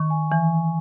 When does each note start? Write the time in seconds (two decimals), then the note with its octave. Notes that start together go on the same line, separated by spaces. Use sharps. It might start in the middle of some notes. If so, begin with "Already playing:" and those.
Already playing: D#3 C#6
0.10 G#5
0.31 E3 G#5